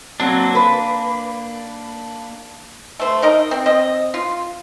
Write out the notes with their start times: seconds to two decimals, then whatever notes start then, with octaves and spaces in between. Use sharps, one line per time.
0.20 F#3 A#3 C4 D4
0.55 B4
2.99 A3 C5
3.22 D#4 A#4 D#5
3.51 C4
3.66 C4 D#5
4.14 F4